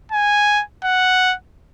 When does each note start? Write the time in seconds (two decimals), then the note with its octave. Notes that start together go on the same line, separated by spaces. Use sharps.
0.12 G#5
0.84 F#5